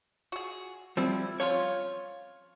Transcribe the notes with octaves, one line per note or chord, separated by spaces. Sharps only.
F#4 G#4
F3 G3 C4 E4
F3 C#4 F4 C#5